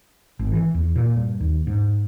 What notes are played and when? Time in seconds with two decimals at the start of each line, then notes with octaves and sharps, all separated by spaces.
0.39 G#1
0.52 E3
0.74 E2
0.96 A#2
1.16 G2
1.40 D#2
1.67 G#2